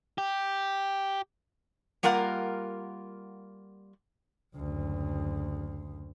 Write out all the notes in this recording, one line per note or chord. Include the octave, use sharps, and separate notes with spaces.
G4
G3 A#3 F4 A#4 F#5
F#1 D2